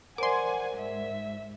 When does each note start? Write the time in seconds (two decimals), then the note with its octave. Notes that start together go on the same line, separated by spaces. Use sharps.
0.18 A#4 C5 D5 F#5 G#5 C6 D6
0.77 G#2 E5